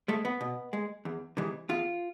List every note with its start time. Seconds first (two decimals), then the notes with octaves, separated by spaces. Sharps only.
0.08 G#3 A3
0.25 B3
0.41 B2
0.73 G#3
1.05 E2
1.37 C3 E3 G#3
1.69 E2 F4